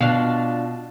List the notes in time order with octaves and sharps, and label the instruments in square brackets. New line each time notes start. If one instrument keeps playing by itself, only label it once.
[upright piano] B2 [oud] D4 F4